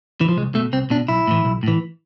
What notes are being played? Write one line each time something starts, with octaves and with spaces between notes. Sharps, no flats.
E3
F3
C2 G#3
B2 A3
C2 C4
B2 D4
B1 E4
A2 E3
B1
A2 E3